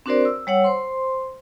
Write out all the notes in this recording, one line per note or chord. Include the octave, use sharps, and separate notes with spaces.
C4 D4 F#4 A#4 C5 D5
E6
G3 C#5 F#5 E6
C5 C6